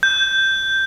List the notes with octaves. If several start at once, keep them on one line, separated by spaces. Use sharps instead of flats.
G6